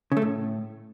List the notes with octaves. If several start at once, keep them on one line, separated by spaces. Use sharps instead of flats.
C#3
A3
A2